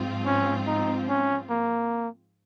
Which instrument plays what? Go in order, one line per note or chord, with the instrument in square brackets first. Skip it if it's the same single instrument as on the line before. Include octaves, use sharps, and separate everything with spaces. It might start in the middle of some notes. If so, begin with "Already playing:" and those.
Already playing: [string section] G#2 F3 C4 F4
[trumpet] C#4
D#4
C#4
A#3